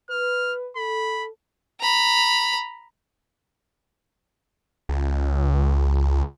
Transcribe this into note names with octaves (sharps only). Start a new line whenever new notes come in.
B4 F6
A4 B5
A#5 B5
C#2